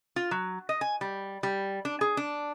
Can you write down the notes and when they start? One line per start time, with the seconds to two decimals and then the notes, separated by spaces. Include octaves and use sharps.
0.16 F4
0.31 F#3
0.69 D#5
0.81 G#5
1.01 G3
1.43 G3
1.85 D4
2.01 G#4
2.17 D4